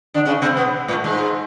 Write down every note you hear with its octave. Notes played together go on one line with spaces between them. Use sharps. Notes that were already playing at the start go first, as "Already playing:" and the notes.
D3 D4
C#3 C#4
C3 C4
B2 B3
A2 A3
G#2 G#3